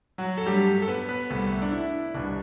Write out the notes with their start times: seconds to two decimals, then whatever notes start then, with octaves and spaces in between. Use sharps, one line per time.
0.18 F#3 F#4
0.38 A4
0.46 G2 F#3 G3 A3 G4
0.82 A4
0.88 B3 B4
1.09 B3 B4
1.30 C2 C3 G3 A3 B3 A4
1.62 D4
1.72 E4
2.14 C2 B2 G3 B3 D4